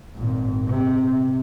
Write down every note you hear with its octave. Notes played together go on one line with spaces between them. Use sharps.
G#1 A#2
C3